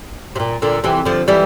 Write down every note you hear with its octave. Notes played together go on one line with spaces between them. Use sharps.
C3
A#2
A#2 D3
C3 E3
D3 F3
E3 G3